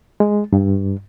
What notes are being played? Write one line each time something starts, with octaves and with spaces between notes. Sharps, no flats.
G#3
G2